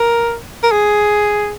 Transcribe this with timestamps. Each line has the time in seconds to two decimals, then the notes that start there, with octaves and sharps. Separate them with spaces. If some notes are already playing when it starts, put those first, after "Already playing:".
Already playing: A#4
0.63 A#4
0.72 G#4